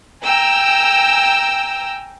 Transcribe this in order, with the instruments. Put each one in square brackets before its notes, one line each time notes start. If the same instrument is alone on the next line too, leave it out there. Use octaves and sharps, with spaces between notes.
[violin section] G5 G#5 A#5 E6